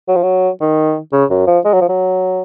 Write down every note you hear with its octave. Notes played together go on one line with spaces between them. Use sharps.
F#3
F3
F#3
D#3
C#3
F#2
F3
G#3
F#3
F3
F#3